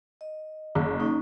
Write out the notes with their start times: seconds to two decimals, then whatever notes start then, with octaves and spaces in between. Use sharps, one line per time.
0.21 D#5
0.75 F#1
1.00 A#3 C#4 D#4